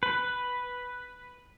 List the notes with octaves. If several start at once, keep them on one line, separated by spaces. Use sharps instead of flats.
B4